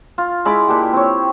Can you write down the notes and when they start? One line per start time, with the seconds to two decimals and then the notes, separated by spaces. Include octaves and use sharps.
0.18 F4
0.45 G#3 E4 B5 D6
0.68 A#2 D4 G4
0.93 C4 C#5